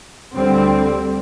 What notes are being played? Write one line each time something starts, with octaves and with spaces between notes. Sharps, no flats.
D2 D3 G3 C4